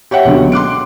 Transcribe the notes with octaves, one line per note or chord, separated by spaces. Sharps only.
G4 C#5 E5 F#5 G5
C#2 B2 D3 F#3
C6 D6 F#6 D7